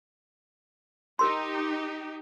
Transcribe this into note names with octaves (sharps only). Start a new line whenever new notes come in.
D#4 G4 A#4 C6